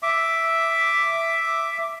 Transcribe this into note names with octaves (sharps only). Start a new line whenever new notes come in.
E5 D6